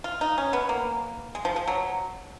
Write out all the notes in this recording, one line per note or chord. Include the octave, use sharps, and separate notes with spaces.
F4
D#4
C#4
B3
A#3
G#3
F3
F3
F#3